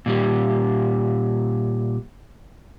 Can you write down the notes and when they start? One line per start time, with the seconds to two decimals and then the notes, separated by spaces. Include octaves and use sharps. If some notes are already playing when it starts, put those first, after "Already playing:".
0.06 A#2 G3